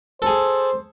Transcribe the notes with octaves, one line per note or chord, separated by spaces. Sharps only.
G#4 A4 C5